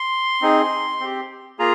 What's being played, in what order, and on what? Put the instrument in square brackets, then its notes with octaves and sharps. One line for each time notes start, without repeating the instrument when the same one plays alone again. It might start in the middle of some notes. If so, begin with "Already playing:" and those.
Already playing: [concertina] C6
C4 D#4 G#4
C4 G4
A#3 F4 G#4 A#5